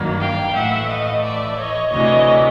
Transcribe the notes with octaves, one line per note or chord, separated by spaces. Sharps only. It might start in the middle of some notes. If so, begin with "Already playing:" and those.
Already playing: G2 D#3 F#3 A#3
F5 G5
A2 E3 A3 E5 F#5
D#5 F5
D5 E5
C#5 D#5
D2 C3 E3 C#5 D#5